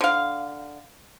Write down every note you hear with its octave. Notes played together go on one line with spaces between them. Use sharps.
D3 F5